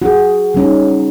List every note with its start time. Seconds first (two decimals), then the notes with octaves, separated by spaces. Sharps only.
0.02 F#4 G#4
0.54 G3 C#4 D#4